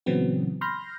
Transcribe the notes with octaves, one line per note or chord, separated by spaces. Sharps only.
A#2 C#3 E3 F#3 B3 C4
B5 C6 F6 G6 A#6